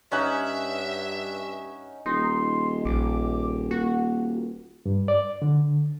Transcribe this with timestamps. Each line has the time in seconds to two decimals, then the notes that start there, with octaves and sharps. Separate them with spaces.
0.12 G2 C#4 D#4 E5 F#5
2.06 D#1 D#4 C6
2.85 A#1 D6
3.71 A#3 F#4
4.86 G2
5.08 D5
5.42 D3